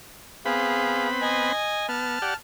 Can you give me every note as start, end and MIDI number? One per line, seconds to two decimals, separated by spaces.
0.46 1.52 59
0.46 1.52 60
0.46 1.07 68
0.46 1.07 77
0.46 1.52 83
1.22 1.86 75
1.22 1.86 80
1.89 2.19 59
1.89 2.35 81
1.89 2.35 89
2.22 2.34 67
2.22 2.34 74
2.22 2.34 78